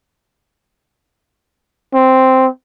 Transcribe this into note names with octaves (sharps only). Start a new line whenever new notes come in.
C4